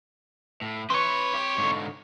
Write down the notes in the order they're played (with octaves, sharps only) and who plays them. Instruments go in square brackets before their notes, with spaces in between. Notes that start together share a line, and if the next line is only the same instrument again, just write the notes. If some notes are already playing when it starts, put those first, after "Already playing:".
[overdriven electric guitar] A2
[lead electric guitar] C4 C#5 [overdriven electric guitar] E4 B4
[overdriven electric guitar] G4
G#2 D3